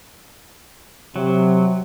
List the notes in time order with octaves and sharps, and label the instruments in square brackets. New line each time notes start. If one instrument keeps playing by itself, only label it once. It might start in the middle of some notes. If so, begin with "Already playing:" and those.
[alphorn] C3 [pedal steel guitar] F#3